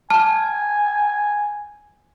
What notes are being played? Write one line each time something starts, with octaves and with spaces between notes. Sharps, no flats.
G#5 A5 F6